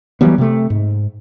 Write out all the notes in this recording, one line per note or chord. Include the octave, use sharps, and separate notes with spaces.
E3 F#3 G3 B3
C3 A3
G#2